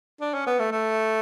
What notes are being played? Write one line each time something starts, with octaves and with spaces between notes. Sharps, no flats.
D4
C#4
B3
A3
A3